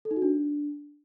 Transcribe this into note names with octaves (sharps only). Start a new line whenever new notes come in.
A4
D#4
F#4
D4